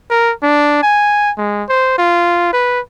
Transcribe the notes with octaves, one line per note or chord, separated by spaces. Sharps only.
A#4
D4
G#5
G#3
C5
F4
B4